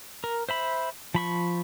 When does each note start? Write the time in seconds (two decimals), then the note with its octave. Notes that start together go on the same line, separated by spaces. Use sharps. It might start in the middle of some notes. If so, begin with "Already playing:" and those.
0.24 A#4
0.49 C5 E5 B5
1.14 F3 B5 C#6